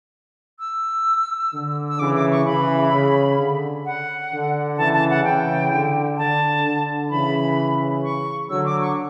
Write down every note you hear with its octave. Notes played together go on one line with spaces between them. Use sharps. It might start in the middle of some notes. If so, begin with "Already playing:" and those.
E6
D3
E6
C#3 E3 D6
D6
C#6
C#3 E3 B5
C#3
D3
F#5
D3
C#3 E3 A5
A5
F#5
C#3 E3 G5
D3
D3 A5
D3
C#3 E3 B5
C#6
D3 F#3 E6
D6
C#6